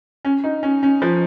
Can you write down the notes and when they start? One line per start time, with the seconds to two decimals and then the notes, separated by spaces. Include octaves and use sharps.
0.25 C#4
0.44 D#4
0.63 C#4
0.83 C#4
1.02 F3